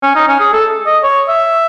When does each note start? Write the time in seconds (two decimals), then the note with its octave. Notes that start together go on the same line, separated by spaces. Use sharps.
0.03 C#4
0.15 D#4
0.28 C#4
0.40 G#4
0.53 A4
0.86 D#5
1.03 C#5
1.29 E5